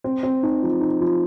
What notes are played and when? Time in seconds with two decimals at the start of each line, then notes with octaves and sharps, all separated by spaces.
0.04 C4
0.23 C4
0.43 D#4
0.63 F3
0.81 D#4
1.01 F3